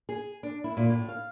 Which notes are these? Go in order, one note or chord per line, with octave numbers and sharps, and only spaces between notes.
G#4
D4
E4
A#2
A2
F5